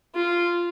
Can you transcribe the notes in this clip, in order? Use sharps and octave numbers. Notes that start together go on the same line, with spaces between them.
F4